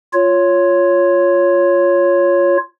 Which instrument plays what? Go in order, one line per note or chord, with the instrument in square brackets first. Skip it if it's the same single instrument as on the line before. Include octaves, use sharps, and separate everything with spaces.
[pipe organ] F4 C#5